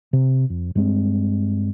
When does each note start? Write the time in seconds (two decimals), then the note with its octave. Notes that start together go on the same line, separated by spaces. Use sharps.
0.13 C3
0.50 F2
0.75 G2 G#3 A#3 C4